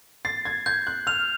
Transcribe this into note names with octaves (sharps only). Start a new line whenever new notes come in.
A6 C7
G#6
G6 G#6
F#6
F6 F7